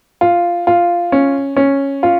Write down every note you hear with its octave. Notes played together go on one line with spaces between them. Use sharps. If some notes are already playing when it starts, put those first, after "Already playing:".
F4
F4
C#4
C#4
F4